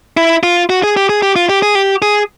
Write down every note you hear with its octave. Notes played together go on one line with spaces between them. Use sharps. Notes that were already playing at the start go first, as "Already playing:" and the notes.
E4
F4
F#4
G#4
G4
G#4
G4
F4
G4
G#4
G4
G#4